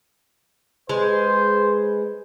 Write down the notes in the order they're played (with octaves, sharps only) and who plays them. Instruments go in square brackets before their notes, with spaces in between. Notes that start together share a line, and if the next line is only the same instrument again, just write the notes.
[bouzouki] G#3 [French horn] B4 [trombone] C5